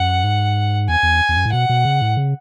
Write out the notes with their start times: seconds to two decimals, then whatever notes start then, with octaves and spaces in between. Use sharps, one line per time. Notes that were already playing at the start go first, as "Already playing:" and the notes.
Already playing: F#2 F#5
0.24 G#2
0.89 E2 G#5
1.03 E2
1.29 E2
1.37 F#2
1.45 A2
1.53 B2 F#5
1.69 B2
1.85 C#3
2.01 A2
2.17 C#3